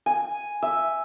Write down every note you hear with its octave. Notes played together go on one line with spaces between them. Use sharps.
G#5
E5